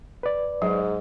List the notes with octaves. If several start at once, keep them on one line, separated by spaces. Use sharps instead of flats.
B4 D5
G#2 F#3